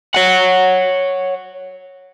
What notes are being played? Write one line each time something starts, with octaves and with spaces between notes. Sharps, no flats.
C#5 F#5